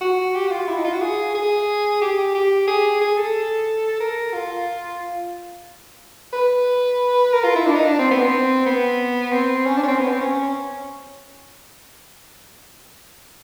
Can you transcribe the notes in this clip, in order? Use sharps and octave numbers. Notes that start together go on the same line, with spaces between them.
F#4
G4
F#4
F4
E4
D#4
F4
F#4
G#4
G#4
G4
G4
G#4
G#4
A4
A#4
F4
B4
A#4
F4
E4
D4
D#4
D4
C4
B3
C4
B3
C4
C#4
D4
C#4
C4
B3
C4
C#4